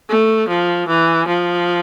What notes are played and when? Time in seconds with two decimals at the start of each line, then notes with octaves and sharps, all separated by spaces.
0.09 A3
0.49 F3
0.88 E3
1.28 F3